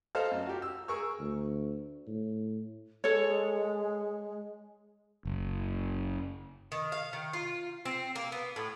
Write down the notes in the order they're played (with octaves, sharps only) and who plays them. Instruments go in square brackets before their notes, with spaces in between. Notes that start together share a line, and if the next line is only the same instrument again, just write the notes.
[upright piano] A4 C5 D#5 F5 A5 F6
F#2
F#4 G4
E6
G#4 A#4 C#6 E6
[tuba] D2
A2
[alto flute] G#3 [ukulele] A4 C#5
[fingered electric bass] F#1
[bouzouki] D#3
F5
D#3
F4
C4
A#3
B3
A2